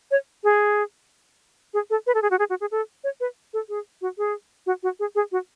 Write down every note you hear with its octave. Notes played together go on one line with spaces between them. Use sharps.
C#5
G#4
G#4
A4
B4
A4
G#4
F#4
G#4
F#4
G#4
A4
C#5
B4
A4
G#4
F#4
G#4
F#4
F#4
G#4
G#4
F#4